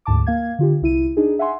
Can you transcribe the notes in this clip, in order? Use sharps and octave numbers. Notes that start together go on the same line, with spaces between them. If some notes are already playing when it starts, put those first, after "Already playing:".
D2 G#2 A5 D6
A#3 F5 G#6
D3 F4 G4
C2 E4 D#7
D4 D#4 G#4
E5 F#5 G#5 C6